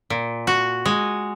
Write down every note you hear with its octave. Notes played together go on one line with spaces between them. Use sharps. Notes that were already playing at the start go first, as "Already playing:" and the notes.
A#2
F#4
G#3